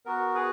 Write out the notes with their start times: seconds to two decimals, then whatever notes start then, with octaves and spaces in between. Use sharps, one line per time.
0.06 B3 F#4 A#4
0.35 G#4 B4